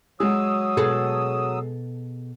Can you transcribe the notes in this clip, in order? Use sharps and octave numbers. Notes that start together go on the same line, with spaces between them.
F#3 G#3 D#6 E6
B2 G#4 A4